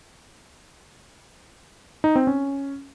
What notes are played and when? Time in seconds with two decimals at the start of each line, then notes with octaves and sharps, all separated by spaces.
2.04 D#4
2.16 C4
2.27 C#4